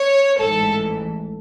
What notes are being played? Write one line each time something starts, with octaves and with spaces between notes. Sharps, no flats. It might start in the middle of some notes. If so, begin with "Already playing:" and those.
Already playing: C#5
A1 G#2 E3 A4